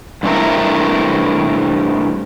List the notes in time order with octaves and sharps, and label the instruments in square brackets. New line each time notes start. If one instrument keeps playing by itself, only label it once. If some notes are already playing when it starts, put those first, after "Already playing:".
[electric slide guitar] G2 C3 E3 A3 E4 A#4